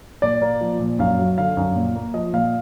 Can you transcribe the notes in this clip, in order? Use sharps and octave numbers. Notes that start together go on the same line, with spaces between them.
A#2 D5
A#3
F3
A#2
F#2 F5
F#3
D3 F5
F#2
A#2
A#3
F3 D#5
A#2 F5